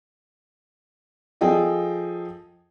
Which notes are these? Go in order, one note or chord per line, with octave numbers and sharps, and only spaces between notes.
F3 G#4 A4 D#5 G5